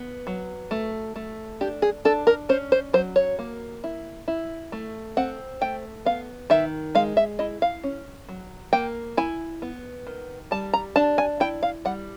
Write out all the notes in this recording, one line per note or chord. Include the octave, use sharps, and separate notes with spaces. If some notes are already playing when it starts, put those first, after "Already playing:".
Already playing: B3
F#3
A3
A3
D4 G4
G#4
D4 A4
A#4
C#4 C5
C5
F#3 C5
C#5
A#3
E4
E4
A3
C4 F#5
A3 G5
B3 F5
D#3 E5
G#3 F5
E5
E4 D#5
F5
C#4
F#3
A#3 G5
E4 G#5
B3
D#3
G3 A5
A#5
D4 A5
G#5
E4 G5
F5
G3 F#5